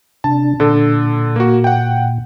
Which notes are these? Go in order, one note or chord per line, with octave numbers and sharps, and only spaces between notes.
C3 D4 A5
A#2 D3 A4
A#3 F#4
F#5 G5